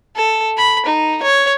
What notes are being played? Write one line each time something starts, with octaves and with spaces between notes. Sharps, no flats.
A4
B5
D#4
C#5